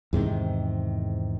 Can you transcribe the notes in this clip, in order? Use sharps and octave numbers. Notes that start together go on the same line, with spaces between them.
E2 G#2 C3 D#3